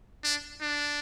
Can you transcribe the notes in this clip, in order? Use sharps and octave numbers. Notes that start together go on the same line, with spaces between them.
D4
D4